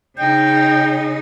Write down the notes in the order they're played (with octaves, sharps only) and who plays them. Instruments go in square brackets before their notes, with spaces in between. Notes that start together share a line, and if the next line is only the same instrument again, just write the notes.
[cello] C#3 D#4 [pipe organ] G5